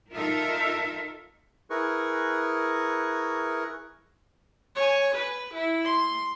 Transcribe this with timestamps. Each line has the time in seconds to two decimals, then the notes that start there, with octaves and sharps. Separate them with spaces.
0.12 D#4 F4 A4 A#4 E5
1.70 E4 G#4 A#4 B4 C#6
4.76 C#5 G#5
5.15 B4
5.54 E4
5.85 C6